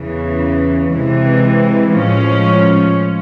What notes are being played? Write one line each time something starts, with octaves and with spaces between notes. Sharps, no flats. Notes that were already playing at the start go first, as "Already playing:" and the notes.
Already playing: E2 C#3 E3
C3 E3 G#3 C4
A2 F3 G#3 C#4